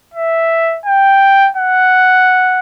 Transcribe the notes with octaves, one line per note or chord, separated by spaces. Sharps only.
E5
G5
F#5